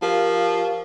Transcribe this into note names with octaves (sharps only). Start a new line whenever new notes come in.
F3 G4 A#4 F5